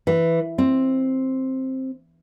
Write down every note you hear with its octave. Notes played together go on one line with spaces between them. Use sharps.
E3
C4